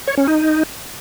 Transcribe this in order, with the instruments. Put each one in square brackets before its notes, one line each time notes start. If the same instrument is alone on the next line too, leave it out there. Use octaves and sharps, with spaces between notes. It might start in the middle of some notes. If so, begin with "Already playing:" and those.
[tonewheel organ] C#5
C#4
D#4